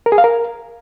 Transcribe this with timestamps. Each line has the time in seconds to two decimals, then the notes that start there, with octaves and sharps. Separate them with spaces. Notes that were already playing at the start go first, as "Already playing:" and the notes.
0.06 A#4
0.12 G#4
0.18 F5
0.24 A#4